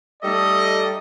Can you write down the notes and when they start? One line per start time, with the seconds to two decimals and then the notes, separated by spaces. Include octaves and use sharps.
0.23 G3 A3 D#4 A4 D5 D#5